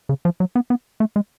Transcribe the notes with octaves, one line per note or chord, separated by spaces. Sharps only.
C#3
F3
F#3
B3
B3
A3
G#3